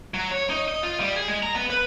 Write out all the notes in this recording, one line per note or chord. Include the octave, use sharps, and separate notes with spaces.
F#3
C#5
D#4
D#5
F4
G3
G#4
G#3
A#5
B3
B4